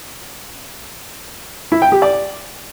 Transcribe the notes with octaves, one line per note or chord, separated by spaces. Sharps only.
E4
G5
G4
D5